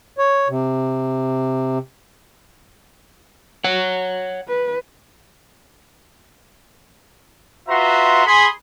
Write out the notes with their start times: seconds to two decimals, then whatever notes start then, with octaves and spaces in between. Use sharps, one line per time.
0.18 C#5
0.49 C3
3.64 C#5 F#5
4.48 B4
7.68 F4 F#4 B4 E5 A#5 C6
8.26 G#4 B5 C6